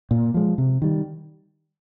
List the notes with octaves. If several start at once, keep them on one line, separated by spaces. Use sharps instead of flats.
A#2
F3 G#3
C3
D#3 G3